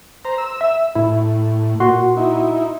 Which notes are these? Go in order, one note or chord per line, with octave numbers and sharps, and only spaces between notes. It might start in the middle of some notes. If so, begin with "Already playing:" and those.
C5 A#5
E6
E5
A2 E4
A#2 F#4 C6
D#4 E4